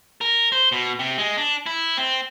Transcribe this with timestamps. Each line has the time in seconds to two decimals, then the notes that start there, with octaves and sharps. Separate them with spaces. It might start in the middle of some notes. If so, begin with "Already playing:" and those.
0.21 A#4
0.52 C5
0.72 B2
0.99 C3
1.18 G#3
1.38 D4
1.66 E4
1.97 C4